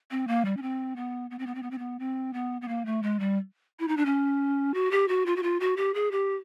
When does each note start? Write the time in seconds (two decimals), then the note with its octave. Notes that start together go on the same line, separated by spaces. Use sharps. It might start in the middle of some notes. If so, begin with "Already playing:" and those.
0.11 C4
0.28 A#3
0.45 G3
0.57 C#4
0.62 C4
0.96 B3
1.30 B3
1.39 C4
1.46 B3
1.55 C4
1.63 B3
1.71 C4
1.78 B3
1.99 C4
2.33 B3
2.61 B3
2.68 A#3
2.86 A3
3.02 G#3
3.19 G3
3.79 E4
3.88 D#4
3.97 D4
4.05 C#4
4.74 F#4
4.91 G4
5.08 F#4
5.26 F4
5.36 F#4
5.43 F4
5.60 F#4
5.77 G4
5.94 G#4
6.11 G4